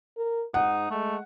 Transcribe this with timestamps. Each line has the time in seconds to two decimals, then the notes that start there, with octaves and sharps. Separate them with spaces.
0.17 A#4
0.54 G#2 D#4 F#5
0.90 G#3 A3